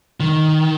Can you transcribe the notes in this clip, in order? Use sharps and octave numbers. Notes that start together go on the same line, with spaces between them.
D#3